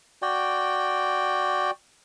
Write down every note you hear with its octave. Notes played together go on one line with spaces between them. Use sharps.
F#4 D5 G5